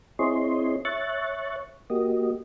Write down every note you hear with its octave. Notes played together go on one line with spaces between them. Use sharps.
C4 E4 G#4 C#5 D#5 C6
C#5 E5 C#6 F#6 A6
A#3 F#4 G4 D#5